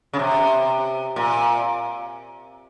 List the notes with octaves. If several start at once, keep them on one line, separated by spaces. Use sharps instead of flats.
C#3
C3
A#2